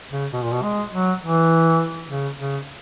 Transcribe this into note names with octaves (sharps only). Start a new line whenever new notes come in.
C#3
B2
A#2
B2
G#3
F#3
E3
C#3
C#3